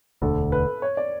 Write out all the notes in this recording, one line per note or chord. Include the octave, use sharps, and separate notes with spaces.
E1 D2 D3 A4
B4
C#5
D5